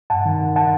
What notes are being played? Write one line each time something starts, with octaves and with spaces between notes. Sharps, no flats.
G2 F#5 A5
D#3
D#3
F#5 A5